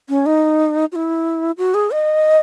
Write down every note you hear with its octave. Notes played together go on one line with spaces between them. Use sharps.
C#4
D#4
F#4
E4
F#4
G#4
D#5